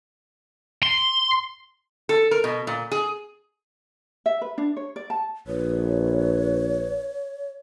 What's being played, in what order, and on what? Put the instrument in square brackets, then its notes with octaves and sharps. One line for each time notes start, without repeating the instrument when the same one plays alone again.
[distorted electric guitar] C6
[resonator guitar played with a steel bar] A4
A#4
B2
A#2
G#4
[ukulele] E5
B4
D4
C#5
D5
A5
[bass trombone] A#1 [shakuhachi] B4 [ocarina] C#5